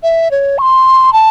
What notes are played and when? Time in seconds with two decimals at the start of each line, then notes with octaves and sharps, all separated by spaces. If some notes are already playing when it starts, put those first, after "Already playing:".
0.03 E5
0.31 C#5
0.58 C#6
0.61 C6
1.13 A5